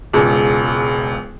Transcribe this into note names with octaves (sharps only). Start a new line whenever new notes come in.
E1 C#2